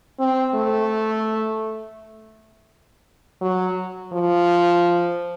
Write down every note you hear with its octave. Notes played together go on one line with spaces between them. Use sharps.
C4
A3
F#3
F3